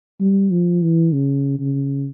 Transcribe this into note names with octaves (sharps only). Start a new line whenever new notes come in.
G3
F3
E3
C#3
C#3